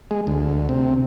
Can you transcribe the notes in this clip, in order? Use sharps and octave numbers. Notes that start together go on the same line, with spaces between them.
G#3
D2
C3